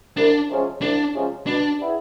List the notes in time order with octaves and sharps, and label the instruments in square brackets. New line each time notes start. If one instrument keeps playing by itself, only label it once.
[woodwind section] C2 [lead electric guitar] D4
[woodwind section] C3 F3 G#3 C#4
[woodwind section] C2 [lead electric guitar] D4
[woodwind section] C3 F3 G#3 C#4
[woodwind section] B2 [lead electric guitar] D4
[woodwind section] G3 B3 E4 G#4